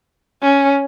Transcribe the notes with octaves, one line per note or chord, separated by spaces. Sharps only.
C#4